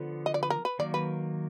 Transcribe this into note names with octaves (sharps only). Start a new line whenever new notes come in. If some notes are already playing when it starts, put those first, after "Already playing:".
Already playing: D3 F3 B3
D#5
D5
B4
A#4
B4
D#3 F#3 A#3 D5
B4